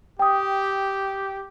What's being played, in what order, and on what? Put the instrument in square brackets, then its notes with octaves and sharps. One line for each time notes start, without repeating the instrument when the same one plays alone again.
[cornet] G4 [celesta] G5 D#6